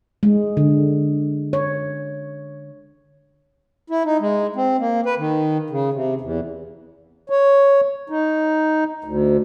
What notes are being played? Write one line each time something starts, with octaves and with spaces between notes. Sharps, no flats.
G#3
D3
C#5
E4
D#4
G#3
C4
A#3
B4
D#3
C#3
C3
E2
C#5
D#4
D2